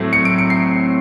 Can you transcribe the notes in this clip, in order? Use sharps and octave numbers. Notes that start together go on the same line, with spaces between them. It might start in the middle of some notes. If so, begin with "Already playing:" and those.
Already playing: A2 F#3 A3 C4
C#7
D7
C#7
C7